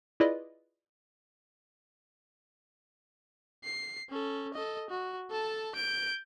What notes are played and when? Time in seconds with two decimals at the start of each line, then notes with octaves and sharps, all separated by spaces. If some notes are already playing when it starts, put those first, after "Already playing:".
0.20 E4 F4 G#4 B4 D5 D#5
3.64 C7
4.10 C#4 A4
4.53 A4 D#5
4.90 F#4
5.31 A4 A5
5.75 G6 D7